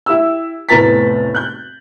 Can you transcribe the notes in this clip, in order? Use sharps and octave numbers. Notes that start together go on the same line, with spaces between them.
E4 G4 E6
F1 A2 B3 A#5 A6 B6
F#6 G6